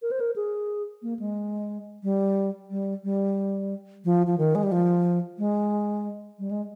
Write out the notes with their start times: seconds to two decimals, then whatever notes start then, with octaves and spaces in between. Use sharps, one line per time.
0.02 A#4
0.11 C5
0.20 A#4
0.36 G#4
1.02 A#3
1.19 G#3
2.03 G3
2.71 G3
3.04 G3
4.05 F3
4.27 F3
4.38 D#3
4.55 G#3
4.63 G3
4.72 F3
5.38 G#3
6.39 G3
6.51 G#3